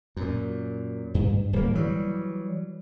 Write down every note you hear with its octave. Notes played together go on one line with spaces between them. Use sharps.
F#2 A#2
G2
D1 G3 A#3
E3 F#3 G3